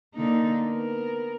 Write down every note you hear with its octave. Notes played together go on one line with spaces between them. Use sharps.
D3 A#3 D#4
B3 A#4